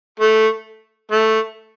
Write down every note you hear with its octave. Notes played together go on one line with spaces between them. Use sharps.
A3
A3